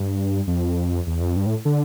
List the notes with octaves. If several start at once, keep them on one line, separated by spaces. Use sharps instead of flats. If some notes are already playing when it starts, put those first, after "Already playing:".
Already playing: G2
F2
E2
F2
G2
A2
D3